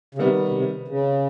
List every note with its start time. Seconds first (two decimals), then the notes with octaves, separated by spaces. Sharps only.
0.15 C#3
0.18 C3 D#3 G3 B3
0.48 B2
0.54 C3
0.88 C#3